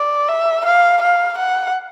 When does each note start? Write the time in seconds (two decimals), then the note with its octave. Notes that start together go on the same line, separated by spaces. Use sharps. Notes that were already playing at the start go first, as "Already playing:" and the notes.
Already playing: D5
0.28 E5
0.65 F5
1.02 F5
1.38 F#5